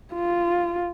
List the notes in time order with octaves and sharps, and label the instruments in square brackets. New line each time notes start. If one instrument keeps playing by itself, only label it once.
[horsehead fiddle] F4